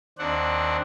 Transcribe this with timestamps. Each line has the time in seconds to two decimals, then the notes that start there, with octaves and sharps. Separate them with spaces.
0.18 D#2 C4 D4 F#5